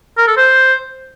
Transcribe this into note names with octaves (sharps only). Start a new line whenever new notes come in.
A#4
A4
C5